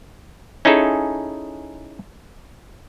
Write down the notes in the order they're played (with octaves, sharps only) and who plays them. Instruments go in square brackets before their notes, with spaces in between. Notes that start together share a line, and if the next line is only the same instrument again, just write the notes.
[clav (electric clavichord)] C#4 D#4 E4 G#4 A4